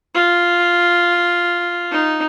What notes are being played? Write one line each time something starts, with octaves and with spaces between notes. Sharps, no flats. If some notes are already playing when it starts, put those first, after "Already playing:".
F4
D#4